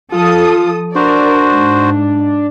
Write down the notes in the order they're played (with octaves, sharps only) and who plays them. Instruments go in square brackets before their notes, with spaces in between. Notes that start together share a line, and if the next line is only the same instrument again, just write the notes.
[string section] F3 A4 D#6 [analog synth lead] F4
[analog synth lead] D4 [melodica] F#4 C5 [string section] A#4 D5
[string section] G#2